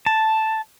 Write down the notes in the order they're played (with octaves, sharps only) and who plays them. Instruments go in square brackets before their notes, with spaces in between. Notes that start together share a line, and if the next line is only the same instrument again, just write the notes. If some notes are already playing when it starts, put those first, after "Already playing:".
[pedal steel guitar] A5